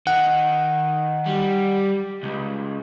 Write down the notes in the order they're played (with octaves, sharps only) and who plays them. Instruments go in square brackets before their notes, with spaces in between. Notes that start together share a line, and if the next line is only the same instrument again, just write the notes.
[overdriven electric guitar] D#3 [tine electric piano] F#5
[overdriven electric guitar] G3
C#2